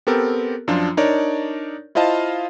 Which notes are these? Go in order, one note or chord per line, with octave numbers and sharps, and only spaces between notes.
B3 C4 G4 A4 A#4
F#2 F3 D4 F4
D4 D#4 A#4 C#5 D5
E4 F4 C5 D#5 F5 A5